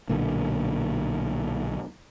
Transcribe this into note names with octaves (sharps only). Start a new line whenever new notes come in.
B1 A#2 D3 A#3